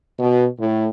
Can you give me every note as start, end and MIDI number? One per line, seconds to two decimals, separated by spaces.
0.19 0.44 47
0.59 0.86 45